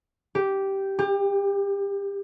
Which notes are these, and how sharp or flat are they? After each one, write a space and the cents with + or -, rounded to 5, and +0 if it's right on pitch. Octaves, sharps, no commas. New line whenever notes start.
G4 -10
G4 +30